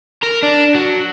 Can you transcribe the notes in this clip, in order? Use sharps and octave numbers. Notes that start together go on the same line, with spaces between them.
A#4
D4
F#3